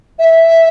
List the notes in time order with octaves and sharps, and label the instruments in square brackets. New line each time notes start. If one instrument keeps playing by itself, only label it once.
[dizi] E5